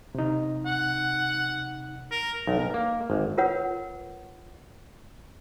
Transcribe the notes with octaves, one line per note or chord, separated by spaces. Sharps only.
C3 D#4
F#5
A#4
B1
A#4
A#3
G#1
F4 A#4 B4 C#5 F#5